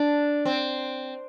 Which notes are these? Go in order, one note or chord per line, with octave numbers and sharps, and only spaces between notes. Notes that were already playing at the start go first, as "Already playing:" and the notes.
Already playing: D4
C4